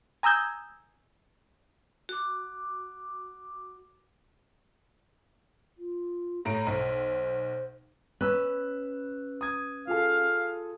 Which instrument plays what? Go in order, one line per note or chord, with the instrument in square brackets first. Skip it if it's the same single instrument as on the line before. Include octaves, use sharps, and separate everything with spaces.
[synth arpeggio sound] G#5 A#5 D#6 E6 G6 G#6
[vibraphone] F#4 D6
[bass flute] F4
[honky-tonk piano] A2 A#5 D7 [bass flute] C#5
[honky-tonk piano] B1 [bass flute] C5
[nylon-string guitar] C#4 B4 [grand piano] B5 E6 F#6
[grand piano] D#6 G#6
[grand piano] F4 G#4 A4 [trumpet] F5